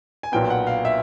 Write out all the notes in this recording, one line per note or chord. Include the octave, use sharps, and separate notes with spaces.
G#5
B1 A#2 F#3 B3 G5
F#5
F5
E5